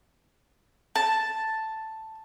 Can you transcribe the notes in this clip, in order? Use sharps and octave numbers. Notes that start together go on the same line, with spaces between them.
A5